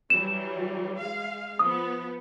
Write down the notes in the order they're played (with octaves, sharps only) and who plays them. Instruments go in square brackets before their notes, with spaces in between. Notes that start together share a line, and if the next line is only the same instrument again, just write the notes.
[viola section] E3 F#3 G3 [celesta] E7
[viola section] G#3 F5
[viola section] F3 B3 [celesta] D#6